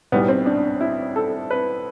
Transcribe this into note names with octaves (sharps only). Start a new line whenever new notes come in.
B1 A2 G3 B3
C4
D4
E4
A4
B4